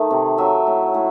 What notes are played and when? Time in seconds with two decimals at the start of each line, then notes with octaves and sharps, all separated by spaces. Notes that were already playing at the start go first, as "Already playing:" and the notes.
Already playing: D#3 A3
0.11 C3
0.38 F#3 E5
0.67 A2
0.94 A2